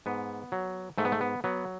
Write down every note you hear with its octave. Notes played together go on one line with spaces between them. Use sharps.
G#2 B3
F#3
G#2 A3
B3
A3
B3
F#3 B3